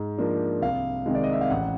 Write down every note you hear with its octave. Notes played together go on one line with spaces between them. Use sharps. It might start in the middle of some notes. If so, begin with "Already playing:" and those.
Already playing: G#2
F3 A#3 D4
C2 F5
C3 D#3 G#3
D5
D#5
E5
F5
A1 F#5